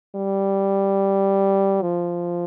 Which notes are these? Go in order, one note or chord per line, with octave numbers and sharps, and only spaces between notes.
G3
F3